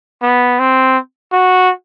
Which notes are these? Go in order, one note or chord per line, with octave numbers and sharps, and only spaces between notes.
B3
C4
F#4